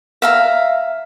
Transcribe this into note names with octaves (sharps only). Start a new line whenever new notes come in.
E5 F5 A#5